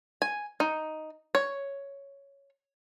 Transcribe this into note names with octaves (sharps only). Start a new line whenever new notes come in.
G#5
D#4
C#5